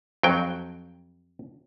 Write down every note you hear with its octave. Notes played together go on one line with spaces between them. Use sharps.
F2 F#3 G5